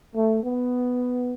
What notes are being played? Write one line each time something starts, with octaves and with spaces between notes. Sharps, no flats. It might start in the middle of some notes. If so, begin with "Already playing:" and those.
A3
B3